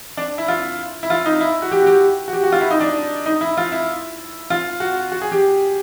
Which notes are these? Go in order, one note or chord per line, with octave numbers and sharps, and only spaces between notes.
D4
E4
F4
E4
F4
D#4
E4
F#4
G4
F#4
G4
F#4
G4
F#4
F4
E4
D#4
D4
D#4
E4
F4
E4
F4
F#4
F#4
G#4
G4